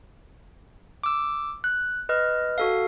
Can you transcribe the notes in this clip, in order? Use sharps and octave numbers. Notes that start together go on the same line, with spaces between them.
D6 E6
F#6
B4 D#5 F6
F#4 A4 F5